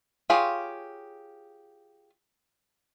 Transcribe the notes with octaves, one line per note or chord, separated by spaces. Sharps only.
F4 G4 G#4 C#5 F5